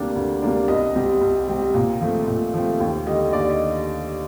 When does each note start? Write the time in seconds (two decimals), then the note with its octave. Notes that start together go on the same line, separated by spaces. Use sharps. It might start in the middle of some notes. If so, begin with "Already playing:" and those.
Already playing: D2 C3 G3 A#3 D4
0.15 D2
0.42 C3 G3 A#3 D4
0.68 C2 D#5
0.95 C3 G3 C4
1.21 C2
1.48 C3 G3 C4
1.74 A#2
2.01 F3 A3 C4
2.27 A#2
2.54 F3 A3 C4
2.80 D#2 G5
3.06 D3 G3 D#5
3.33 D#2 D5
3.50 D#5